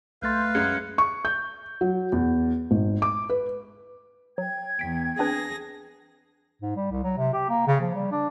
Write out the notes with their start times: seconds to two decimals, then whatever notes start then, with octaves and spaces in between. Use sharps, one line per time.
0.22 B1 A3 B4 F5 C6 G6 A6
0.55 F#2 G#3 F#6 G#6 C#7
0.98 C#6
1.25 G6
1.81 F#3
2.12 E2
2.71 G#1
3.02 D6
3.30 B4
4.38 F#3 G5 G#6
4.79 E2 B6 D7
5.19 C4 D4 G#4 B4 A#6
6.62 G#2
6.76 G3
6.91 C2
7.03 F#3
7.18 C3
7.33 G4
7.49 A#3
7.67 C#3
7.81 F3
7.95 G3
8.12 D4